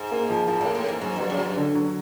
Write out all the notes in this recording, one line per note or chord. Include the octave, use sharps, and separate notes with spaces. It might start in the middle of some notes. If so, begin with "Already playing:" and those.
Already playing: G#2
A#3
F3
G#2 F3
A2 A#3
A2
G#2 A#3
G#2 F#3
G2 F#3
F#2
G2 F#3
D3
F#3